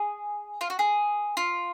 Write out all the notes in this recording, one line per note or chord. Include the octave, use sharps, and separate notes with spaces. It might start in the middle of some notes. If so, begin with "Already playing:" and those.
Already playing: G#4
F4
F#4
G#4
F4